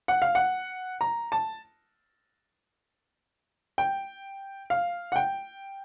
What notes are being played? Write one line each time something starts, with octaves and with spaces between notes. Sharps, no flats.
F#5
F5
F#5
A#5
A5
G5
F5
F#5
G5